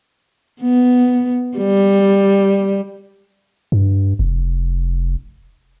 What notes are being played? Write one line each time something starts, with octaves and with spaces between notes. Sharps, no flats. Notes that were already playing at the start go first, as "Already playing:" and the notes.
B3
G3
G2
F1